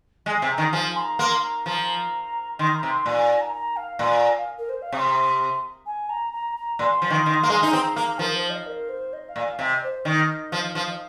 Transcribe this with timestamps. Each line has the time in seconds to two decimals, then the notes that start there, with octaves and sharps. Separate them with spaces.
0.26 G#3 G#5
0.42 C3
0.50 A#5
0.58 D#3
0.73 F3 G#5
0.96 C6
0.99 A#5
1.19 A#3 C6
1.43 A#5
1.66 F3 A#5
2.59 D#3 C6
2.75 A#5
2.83 C3
2.90 C6
3.06 A#2 G#5
3.18 G#5
3.30 G#5
3.41 A#5
3.53 A#5
3.76 F5
3.99 A#2 C6
4.15 A#5
4.30 F5
4.58 A#4
4.69 C5
4.81 F5
4.92 C3 D#6
4.97 C6
5.86 G#5
6.09 A#5
6.33 A#5
6.56 A#5
6.79 A#2 C6
7.02 F3
7.10 D#3
7.26 D#3
7.43 A#3
7.50 G#3
7.63 D#4
7.72 C4 A#5
7.96 A#3 A#5
8.19 F3 A#4
8.35 C5
8.50 D#5
8.66 A#4
8.89 C5
9.13 D#5
9.28 F5
9.36 A#2
9.43 F5
9.59 C3 D#5
9.83 C5
10.05 D#3 D#5
10.52 F3
10.75 F3